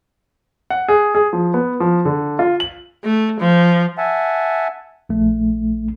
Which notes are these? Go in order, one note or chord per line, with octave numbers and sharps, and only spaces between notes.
F#5
G#4
G#4
F3
B3
F3
D3
F4
F#7
A3
F3
E5 F#5 G#5 A5
A#1 A3